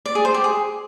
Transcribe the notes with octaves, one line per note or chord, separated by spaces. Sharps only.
D5
G#4
C5
G4
G#4